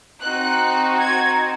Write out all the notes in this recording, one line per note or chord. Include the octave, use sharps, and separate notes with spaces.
C4 D#4 F#4 F#6
G#6